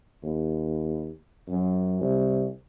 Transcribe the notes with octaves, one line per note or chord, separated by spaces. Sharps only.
D#2
F#2
C2